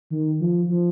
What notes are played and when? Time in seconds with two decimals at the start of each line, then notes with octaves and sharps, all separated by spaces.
0.10 D#3
0.40 F3
0.70 F3